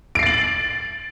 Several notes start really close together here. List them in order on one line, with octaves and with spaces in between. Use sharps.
D7 C7 A6 F#7